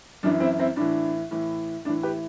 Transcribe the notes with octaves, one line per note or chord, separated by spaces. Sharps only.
F#2 E3 D4
C4 E4
C4 E4
A2 E3 D4
A2 E3
A2 E3 D4
G4 B4